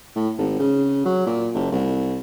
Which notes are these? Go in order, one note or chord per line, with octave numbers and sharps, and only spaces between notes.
A2
G#1
C#3
F#3
A#2
F#1
C2